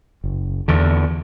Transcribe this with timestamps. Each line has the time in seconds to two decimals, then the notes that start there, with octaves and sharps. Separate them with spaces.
0.24 F#1
0.68 E2 D3